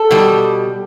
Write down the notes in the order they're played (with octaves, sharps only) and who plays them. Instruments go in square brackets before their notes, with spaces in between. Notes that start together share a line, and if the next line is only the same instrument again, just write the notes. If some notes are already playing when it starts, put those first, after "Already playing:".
Already playing: [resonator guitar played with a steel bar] A4
B2 G3